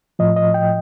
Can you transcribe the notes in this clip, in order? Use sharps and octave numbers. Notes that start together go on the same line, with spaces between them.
A2 F3 D#5
D#5
G5